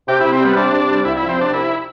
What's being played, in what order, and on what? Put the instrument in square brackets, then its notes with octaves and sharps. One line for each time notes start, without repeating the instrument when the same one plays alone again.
[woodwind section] C3 [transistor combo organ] G4
[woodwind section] C3 [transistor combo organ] E4
[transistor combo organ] C4
[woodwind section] G3 [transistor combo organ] B3
[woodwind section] C3 [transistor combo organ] D4
[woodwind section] C3
G3
[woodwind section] C2 [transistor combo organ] E4
[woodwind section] F3 [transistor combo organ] E4
[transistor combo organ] C4
[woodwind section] C3 [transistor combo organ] D4
[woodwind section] C2 [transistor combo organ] E4